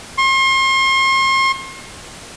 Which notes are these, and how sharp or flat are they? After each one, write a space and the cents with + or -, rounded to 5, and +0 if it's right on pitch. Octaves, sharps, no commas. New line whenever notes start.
C6 +40